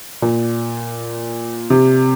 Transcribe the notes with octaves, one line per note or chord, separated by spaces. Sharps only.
A#2
C3